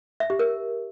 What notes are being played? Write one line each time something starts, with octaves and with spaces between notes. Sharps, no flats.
E5
G4
A#4